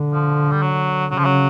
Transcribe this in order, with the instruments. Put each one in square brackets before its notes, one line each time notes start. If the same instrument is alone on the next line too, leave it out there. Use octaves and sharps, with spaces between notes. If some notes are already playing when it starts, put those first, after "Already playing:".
Already playing: [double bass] D3
[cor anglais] F3
G3
F#3
[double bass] C#3 [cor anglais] F#3
[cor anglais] F3
F#3